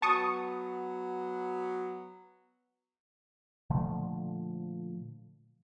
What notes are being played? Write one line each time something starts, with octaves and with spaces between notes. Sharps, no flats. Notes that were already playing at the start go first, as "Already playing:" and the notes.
F#3 B3 A5 C#6 D#6
A#2 D3 F3 A3